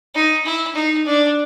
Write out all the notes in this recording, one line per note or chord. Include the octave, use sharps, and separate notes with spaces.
D#4
E4
D#4
D4